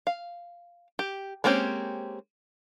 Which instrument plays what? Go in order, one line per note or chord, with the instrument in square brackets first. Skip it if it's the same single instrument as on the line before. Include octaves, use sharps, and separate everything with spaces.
[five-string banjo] F5
G4
G#3 A#3 C4 C#4 G4